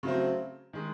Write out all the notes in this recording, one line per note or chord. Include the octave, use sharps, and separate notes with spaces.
C#3 F#3 A3 C4
D#3 G#3